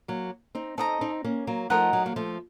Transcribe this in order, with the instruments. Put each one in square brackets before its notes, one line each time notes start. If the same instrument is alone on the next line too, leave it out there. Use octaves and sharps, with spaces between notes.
[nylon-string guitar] F#3 A#3
C4 D#4
[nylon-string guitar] C4 D#4 [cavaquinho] A4 D#5 A#5
[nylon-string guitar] C4 D#4
A#3 C#4
F#3 A#3
[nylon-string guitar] F3 A3 [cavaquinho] D#4 A#4 D#5 F#5
[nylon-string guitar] F#3
A#3
F3 A3